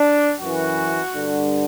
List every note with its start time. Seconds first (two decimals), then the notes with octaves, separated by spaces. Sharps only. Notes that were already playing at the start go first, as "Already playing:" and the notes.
Already playing: D4
0.40 F#2 E3 F#4
1.14 G2 D3